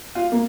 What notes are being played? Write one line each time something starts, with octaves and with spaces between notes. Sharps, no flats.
F4
A#3